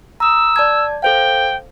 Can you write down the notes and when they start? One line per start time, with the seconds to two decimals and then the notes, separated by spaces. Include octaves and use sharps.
0.20 A#5 D#6 E6
0.56 D5 A5 G#6
1.02 A4 C5 F5 G5